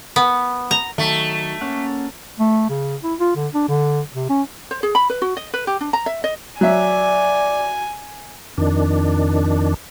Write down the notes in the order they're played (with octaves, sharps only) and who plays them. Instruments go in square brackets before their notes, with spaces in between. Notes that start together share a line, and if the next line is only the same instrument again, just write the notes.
[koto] B3
A#5
[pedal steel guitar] D#3 F#3 [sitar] A3
[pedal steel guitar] A#3 C#4 F#5
[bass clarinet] A3
C#3
E4
F4
D3
D4
D3
C3
C#4
[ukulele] C5
G#4
B5
B4
F#4
D#5
B4
G4
D4
A#5
E5
D#5
[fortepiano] F#3 E5 [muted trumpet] D5 [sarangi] G#5
[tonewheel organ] F2 D#3 D4